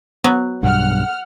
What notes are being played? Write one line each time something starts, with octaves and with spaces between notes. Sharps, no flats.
F#3 B3
B1 G2 F#5 F6